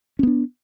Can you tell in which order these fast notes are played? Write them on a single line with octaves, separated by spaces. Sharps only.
C#4 B3 D4